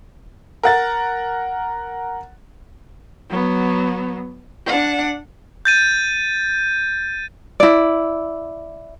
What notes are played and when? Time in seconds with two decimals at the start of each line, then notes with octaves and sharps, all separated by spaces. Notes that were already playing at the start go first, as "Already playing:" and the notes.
0.63 A#4 F#5 A6
3.30 F#3 B3
4.67 D4 F#5
5.65 G6 A6 D#7
7.60 E4 D5